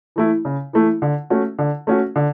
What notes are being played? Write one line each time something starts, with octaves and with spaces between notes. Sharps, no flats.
E3 A3 E4
C#3
E3 A3 E4
D3
A3 C#4 F#4
D3
A3 C#4 F#4
D3